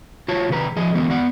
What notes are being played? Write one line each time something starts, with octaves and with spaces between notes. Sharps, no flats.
F4 F#4 C#5 A5
C3 D#3 G#4 B4 A#5
F3 G#4 D#5
D3 E3 G#3 B3 F#4
B3 D5 F#5